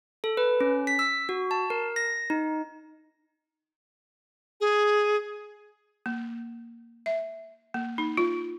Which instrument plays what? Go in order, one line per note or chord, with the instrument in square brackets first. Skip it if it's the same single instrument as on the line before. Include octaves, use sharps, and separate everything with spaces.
[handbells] A4
B4
C#4
B6
E6
F#4
A5
A#4
A#6
D#4
[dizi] G#4
[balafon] A#3
E5
A#3
D#4
F4